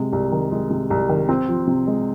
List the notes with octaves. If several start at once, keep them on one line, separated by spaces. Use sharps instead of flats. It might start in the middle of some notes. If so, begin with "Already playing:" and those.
Already playing: C3 G#3
C2
D#3
G#3
C3
C2
D#3
C4
F3
C3
G#3